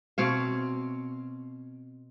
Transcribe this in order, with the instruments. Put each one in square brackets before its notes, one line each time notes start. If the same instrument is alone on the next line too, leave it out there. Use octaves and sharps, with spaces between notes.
[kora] B2 C4 C#5 F5